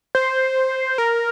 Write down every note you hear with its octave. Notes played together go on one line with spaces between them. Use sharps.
C5
A#4